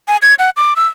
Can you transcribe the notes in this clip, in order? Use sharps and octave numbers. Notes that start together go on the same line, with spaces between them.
G#5
G#6
F#5
D6
E6